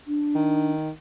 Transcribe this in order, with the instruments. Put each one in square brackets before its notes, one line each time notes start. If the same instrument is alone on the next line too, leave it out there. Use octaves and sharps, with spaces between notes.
[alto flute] D4
[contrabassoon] D#3